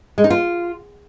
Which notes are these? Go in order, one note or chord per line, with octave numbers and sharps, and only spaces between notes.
G#3
D#4
F4